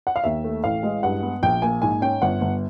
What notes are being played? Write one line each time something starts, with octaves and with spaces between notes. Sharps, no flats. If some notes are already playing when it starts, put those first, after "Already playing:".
F#5
F5
D#2 E5
A3
A1 F5
G#3
G2 F#5
B3
A#1 G5
A#3 G#5
G#2 G#5
C#4 G5
G1 F#5
G1